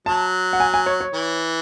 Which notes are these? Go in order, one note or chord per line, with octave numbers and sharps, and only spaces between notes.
F#3 A5
F#5
G#5
G#5
C#5
C#5
E3